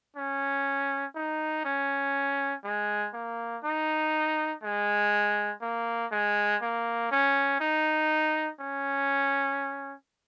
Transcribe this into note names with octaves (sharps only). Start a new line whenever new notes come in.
C#4
D#4
C#4
G#3
A#3
D#4
G#3
A#3
G#3
A#3
C#4
D#4
C#4